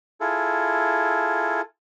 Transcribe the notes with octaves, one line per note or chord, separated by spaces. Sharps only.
E4 F4 G#4 A4